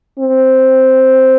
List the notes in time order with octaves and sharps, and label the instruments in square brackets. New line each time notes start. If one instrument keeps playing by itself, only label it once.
[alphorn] C4